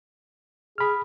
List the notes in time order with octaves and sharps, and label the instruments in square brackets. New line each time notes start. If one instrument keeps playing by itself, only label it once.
[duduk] G#4 [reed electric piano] B5 F6